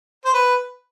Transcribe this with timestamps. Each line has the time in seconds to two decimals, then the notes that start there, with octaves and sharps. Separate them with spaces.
0.25 C5
0.33 B4